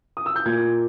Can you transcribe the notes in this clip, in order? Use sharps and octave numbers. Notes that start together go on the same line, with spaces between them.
D#6
E6
G6
A#2 A#3 G#6